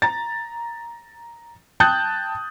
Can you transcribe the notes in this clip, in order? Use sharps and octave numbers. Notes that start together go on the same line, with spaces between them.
A#5 A6
G5 A5 D#6 F#6 G6 A6